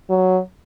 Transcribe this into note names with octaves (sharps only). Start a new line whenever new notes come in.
F#3